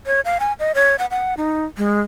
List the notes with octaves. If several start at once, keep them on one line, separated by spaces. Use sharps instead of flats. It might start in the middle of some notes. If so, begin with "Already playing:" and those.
C#5
F5
G#5
D#5
C#5
F#5
F#5
D#4
G#3